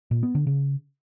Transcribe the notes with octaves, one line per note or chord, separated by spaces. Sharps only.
A#2
B3
D3
C#3